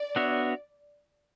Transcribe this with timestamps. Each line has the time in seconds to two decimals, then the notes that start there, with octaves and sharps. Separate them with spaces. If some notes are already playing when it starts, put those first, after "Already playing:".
Already playing: D5
0.16 B3 D4 F#4 C#5 E5